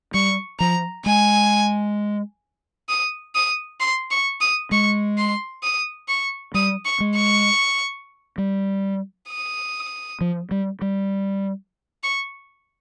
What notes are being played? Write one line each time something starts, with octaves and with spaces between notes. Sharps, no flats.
G3 C#6
F3 A#5
G#3 G#5
D#6
D#6
C6
C#6
D#6
G#3 C#6
C6
D#6
C#6
G3 D#6
C#6
G#3
C#6
G3
D#6
F3
G3
G3
C#6